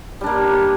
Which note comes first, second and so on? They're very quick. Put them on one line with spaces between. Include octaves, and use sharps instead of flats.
G3 D4 A#3